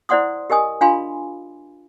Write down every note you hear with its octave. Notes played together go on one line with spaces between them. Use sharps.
E4 C5 D5 F#5 C6 D#6
G4 A#4 D#5 G#5 D#6
D4 F4 F5 G#5 B5 C6